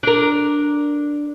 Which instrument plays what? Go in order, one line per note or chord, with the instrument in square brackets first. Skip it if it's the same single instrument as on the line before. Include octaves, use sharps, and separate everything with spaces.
[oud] D4 A#4